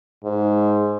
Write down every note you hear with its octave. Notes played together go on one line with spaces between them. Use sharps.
G#2